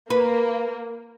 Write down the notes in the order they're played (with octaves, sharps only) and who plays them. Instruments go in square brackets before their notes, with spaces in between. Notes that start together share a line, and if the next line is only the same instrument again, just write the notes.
[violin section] A#3 [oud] B4